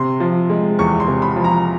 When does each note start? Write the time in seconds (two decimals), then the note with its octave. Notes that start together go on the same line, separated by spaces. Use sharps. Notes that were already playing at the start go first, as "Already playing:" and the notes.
Already playing: C3 C6
0.20 F3
0.49 G#3
0.79 E2 C#6
1.00 C6
1.08 C3
1.22 B5
1.36 F3
1.44 A#5